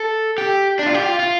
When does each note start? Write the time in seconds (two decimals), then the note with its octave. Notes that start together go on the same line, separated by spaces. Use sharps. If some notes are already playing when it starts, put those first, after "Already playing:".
Already playing: A4
0.38 G4
0.79 D4
0.86 F4
0.94 G4
1.03 F4
1.19 F4